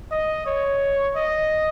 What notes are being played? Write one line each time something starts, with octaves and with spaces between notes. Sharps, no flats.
D#5
C#5
D#5